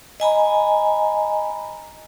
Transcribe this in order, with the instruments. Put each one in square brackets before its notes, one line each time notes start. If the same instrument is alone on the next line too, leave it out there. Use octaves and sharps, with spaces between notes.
[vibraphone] D#5 G#5 A#5 B5